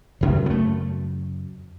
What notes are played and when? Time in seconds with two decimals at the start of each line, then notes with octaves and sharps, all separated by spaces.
0.21 F#2 C#3
0.46 B3
0.50 A3